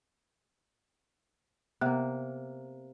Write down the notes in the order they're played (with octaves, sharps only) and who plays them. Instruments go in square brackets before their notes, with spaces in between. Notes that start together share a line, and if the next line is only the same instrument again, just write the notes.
[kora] C3 A#3 [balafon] B3